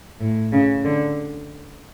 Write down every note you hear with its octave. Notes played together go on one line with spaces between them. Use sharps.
A2
C#3
D3